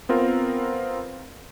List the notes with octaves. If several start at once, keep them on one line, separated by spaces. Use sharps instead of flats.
B3 C4 F4 A#4